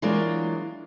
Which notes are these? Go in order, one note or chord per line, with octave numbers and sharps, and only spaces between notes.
E3 F#3 G#3 A#3 D4 F4